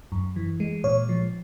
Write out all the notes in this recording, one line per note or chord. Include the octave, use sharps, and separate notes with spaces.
F#2
E3
G#3
A#2 C#5
F3